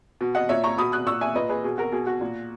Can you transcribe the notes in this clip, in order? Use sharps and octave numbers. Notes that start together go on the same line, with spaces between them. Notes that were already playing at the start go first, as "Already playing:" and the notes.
B2
D#5 F#5
A#2 C#5 E5
A#5 C#6
B2 B5 D#6
D#6 F#6
A#2 C#6 E6
E5 G#5
A#2 B4 D#5
G#4 B4
B2 G#4
F#4 A#4
B2 G#4
F#4
A#2